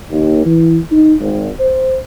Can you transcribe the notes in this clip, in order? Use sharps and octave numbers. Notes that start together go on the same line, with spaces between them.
D#2
E3
D#4
G#1
C5